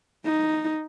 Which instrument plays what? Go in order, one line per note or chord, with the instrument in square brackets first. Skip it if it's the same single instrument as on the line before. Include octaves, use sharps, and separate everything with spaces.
[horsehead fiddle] D#4